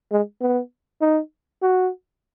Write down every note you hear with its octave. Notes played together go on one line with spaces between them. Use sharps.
G#3
B3
D#4
F#4